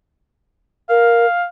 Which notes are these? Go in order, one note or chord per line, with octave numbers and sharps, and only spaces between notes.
A#4 F5